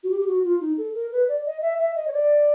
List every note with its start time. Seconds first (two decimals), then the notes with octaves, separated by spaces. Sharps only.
0.03 F#4
0.10 G4
0.21 G4
0.27 F#4
0.44 F4
0.61 D#4
0.78 A4
0.94 A#4
1.12 B4
1.28 D5
1.46 D#5
1.62 E5
1.79 E5
1.96 D#5
2.08 C#5
2.13 D5